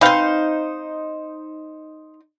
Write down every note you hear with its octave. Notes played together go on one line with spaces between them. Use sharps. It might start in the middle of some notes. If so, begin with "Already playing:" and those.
C4 D#4 B4 C5 F5